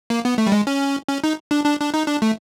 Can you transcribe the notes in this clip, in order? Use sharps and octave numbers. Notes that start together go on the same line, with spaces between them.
A#3
B3
A3
G3
G#3
C#4
C#4
D#4
D4
D4
D4
D#4
D4
A3